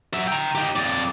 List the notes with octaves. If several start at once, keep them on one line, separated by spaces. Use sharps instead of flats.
F#3 E5
G5 A#5
D#4 G4
F2 D5